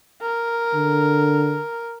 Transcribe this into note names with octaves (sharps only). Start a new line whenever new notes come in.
A#4
D3